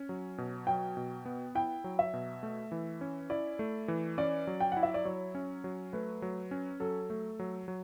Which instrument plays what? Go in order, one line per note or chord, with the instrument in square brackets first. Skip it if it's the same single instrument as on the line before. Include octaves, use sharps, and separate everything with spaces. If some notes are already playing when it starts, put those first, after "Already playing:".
Already playing: [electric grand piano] C#4
F#3
B2
[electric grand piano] F#3 [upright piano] G5
[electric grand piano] B2
B3
[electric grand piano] E4 [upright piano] G5
[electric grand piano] F#3
[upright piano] E5
[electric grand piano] B2
A3
E3
C#4
[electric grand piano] E4 [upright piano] D5
[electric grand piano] A3
E3
[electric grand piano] C#4 [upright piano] D5
[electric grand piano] F#3
[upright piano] G5
[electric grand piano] E4 [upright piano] F#5
[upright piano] E5
D5
[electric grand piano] F#3 [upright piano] C#5
[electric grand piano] C#4
F#3
[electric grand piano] A3 [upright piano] B4
[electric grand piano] F#3
C#4
[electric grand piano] F#3 [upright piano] A4
[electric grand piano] A3
F#3
F#3